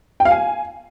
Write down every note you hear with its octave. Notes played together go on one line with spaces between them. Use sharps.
G5
F5
G#5